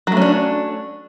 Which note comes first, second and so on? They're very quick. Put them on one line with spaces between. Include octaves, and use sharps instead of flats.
F#3 A3 C#4 D4